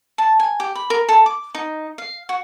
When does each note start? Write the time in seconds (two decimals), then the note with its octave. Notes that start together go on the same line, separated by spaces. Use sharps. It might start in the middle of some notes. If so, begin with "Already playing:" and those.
0.18 A5
0.40 G#5
0.60 G4
0.75 B5
0.90 A#4
1.09 A4
1.26 D6
1.55 D#4
1.98 F5
2.29 F#4